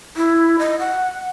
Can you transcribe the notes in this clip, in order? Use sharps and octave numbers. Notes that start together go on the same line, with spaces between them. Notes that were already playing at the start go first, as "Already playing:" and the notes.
E4
D#5
F#5